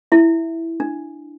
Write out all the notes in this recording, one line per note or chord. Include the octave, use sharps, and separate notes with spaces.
E4 E5
D4